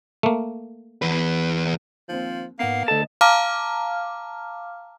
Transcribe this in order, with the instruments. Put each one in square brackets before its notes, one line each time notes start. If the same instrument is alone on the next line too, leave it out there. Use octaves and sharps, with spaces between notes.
[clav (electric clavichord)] A3 A#3
[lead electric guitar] E2 B4
[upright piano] D#2 C4 [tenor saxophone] F3
[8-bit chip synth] G#2 F#5 C7 [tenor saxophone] A#3 [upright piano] B3
[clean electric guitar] D2 A5 [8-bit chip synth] A4 [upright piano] D#5
[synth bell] F5 A5 A#5 D6 F6